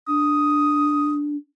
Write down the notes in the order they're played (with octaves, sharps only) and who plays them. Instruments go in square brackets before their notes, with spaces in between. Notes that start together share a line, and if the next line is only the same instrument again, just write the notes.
[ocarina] D4 [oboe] D#6